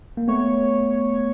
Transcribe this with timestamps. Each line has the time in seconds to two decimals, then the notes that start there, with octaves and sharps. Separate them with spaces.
0.17 A#3
0.28 A3 B3 C#5